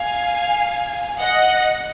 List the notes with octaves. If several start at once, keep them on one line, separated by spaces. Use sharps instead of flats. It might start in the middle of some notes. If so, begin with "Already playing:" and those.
Already playing: F5 G#5
D#5 F#5